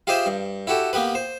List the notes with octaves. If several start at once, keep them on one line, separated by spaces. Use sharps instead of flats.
F4 G4 G#4 C5 D#5 E5
G2
E4 F#4 G4 A4
A#3 B3 G4 B4
C5